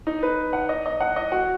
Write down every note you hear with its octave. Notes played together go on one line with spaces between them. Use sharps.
D#4
B4
F#5
D#5
D#5
F#5
D#5
F#4